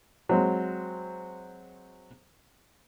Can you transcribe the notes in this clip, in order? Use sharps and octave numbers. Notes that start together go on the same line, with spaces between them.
F#3 G#3 C4